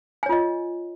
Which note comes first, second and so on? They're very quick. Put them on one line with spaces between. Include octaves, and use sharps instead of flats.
G#5 C#5 F4 D#5